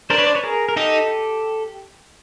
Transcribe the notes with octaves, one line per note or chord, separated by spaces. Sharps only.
D4 A#4 C5
B4 C#5
C5 D5
B4 C#5
G#4 A#4
A#4
D#4 G4 A4